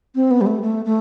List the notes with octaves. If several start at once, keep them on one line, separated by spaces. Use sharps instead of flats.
C4
B3
G3
A3
A3
A3